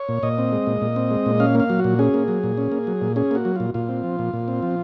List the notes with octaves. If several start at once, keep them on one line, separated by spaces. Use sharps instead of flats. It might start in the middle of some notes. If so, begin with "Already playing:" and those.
Already playing: C#5
A#2
A#2 D#5
C4
G#3
A#2
A#2
C4
G#3
A#2
C#4 F5
A#3 F5
F#3
F#4
A#2
C#4 G#4
A#3
F#3
A#2
C#4
A#3
F#3
A#2
C#4 G#4
A#3 F#4
F#3
A#2 F4
A#2 F4
C4
F3
A#2
A#2
C4
F3